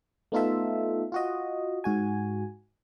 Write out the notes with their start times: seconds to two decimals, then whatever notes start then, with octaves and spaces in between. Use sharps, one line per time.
0.32 A3 B3 D#4 F4 A4 E5
1.12 F4 F#4 D#5
1.84 G#2 F#4 G#5